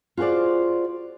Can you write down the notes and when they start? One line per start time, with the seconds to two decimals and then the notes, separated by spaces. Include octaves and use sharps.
0.17 F4 F#4 G#4 C5 D5